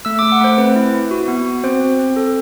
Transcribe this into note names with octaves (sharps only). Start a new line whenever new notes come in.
A3 E6
A3 D6
F#5
A3 C5
C4 B4
E4
E4
F#4
B3
F#4
C4 C5
C4
C4
A4